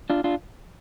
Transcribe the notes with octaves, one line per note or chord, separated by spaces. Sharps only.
D4 F4
D4 F4